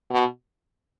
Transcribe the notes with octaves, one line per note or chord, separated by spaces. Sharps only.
B2